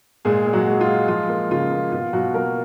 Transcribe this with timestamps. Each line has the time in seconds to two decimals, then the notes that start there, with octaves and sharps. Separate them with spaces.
0.25 A#2 G#3 G#4
0.46 A#2
0.53 F#3 F#4
0.67 G#3
0.81 F4
0.87 G#3
1.08 F3 F4
1.29 A#3
1.51 C#3 F4
1.72 A#3
1.92 B2 F4
2.13 B2 F#3 F#4
2.34 F#3 A#3 A#4